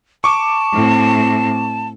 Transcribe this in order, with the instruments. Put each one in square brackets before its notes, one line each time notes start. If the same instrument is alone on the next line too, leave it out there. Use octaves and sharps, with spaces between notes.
[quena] A5 [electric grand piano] C#6 D6
[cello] A2 C4